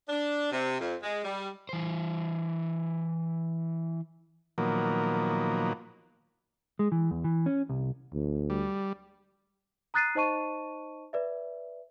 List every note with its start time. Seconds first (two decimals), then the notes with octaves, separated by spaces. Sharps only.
0.09 D4
0.52 C3
0.80 F2
1.03 G#3
1.24 G3
1.69 E3 C5
4.58 A#2 D#3 F3 F#3 A#3 B3
6.79 G#3
6.92 E3
7.11 E2
7.24 E3
7.46 C#4
7.69 C2
8.13 D2
8.50 G3
9.94 A#5 D#6 F#6 A6 C7 D#7
10.15 D#4 C5 D#5 A5 C#6 D#7
11.13 B4 D5 E5